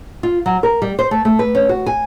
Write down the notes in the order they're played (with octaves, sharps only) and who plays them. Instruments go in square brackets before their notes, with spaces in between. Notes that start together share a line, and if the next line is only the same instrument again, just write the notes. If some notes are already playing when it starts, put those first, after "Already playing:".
[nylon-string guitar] F4
F#3
A#4
G3
C5
A3
A3
B4
C#4
F#4
G#5